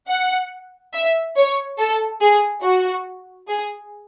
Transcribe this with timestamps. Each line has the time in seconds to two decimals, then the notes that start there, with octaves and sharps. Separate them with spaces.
0.09 F#5
0.93 E5
1.36 C#5
1.78 A4
2.20 G#4
2.62 F#4
3.48 G#4